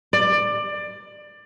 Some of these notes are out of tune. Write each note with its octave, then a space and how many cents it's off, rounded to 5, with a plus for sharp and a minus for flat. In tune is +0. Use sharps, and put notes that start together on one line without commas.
D5 +20